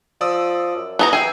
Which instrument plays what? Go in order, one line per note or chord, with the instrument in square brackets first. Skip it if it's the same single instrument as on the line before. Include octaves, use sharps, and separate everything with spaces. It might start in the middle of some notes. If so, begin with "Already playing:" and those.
[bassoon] F3 [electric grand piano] D5 D#6 E6
[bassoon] F#2
[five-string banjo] B3 A5 A#5 [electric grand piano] E4 G4 D#6
[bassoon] E3 [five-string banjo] G#4 [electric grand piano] G5 E6